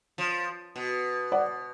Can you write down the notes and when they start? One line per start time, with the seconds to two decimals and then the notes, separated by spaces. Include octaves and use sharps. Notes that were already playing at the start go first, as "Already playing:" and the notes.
0.18 F3
0.76 B2
1.32 D5 F#5